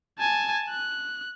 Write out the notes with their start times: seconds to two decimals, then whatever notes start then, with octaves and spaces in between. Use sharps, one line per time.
0.19 G#5 A5
0.70 F#6